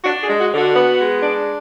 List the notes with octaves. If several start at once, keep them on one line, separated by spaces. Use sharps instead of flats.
D4 F#4
G#4
G#3
F#4
D3
F#4
B3
G#3
D4